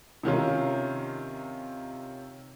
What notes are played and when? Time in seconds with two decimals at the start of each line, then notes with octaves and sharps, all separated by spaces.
0.23 C3 D#3 C#4 F4